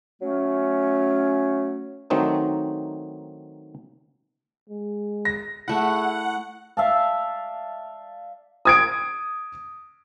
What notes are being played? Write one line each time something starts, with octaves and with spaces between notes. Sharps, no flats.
F#3 A3 C#4
D#3 F#3 A3 C4 D4 D#4
G#3
A#6
A3 E4 G#4 F#5
D5 E5 F5 A5
D#6 G#6 D7